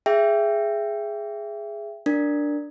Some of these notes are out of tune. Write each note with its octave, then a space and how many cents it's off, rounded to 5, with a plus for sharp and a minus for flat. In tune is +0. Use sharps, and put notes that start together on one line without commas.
G#4 +0 E5 +20 G5 +0
D4 +0 A#4 +0